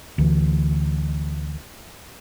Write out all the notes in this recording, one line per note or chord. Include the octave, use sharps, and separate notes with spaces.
D2 E3